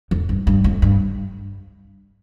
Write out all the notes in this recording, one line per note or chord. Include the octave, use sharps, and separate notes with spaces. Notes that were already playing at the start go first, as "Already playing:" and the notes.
F2
G2
G2
F2
G2